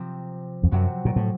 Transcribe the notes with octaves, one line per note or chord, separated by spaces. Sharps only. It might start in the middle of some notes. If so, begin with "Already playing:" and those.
Already playing: C3 F3 C4
F2
F#2 C3 F#3 C4 F#4
A#2
A2